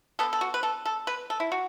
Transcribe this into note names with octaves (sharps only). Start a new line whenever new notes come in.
D3 B3 A4
A4
F#4
B4
A4
A4
B4
A4
E4
F#4